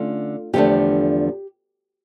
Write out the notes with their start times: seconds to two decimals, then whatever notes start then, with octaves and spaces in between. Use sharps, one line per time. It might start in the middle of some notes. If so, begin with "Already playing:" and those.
Already playing: D3 A3 C#4 F4
0.53 E2 D3 F3 A3 D4 G4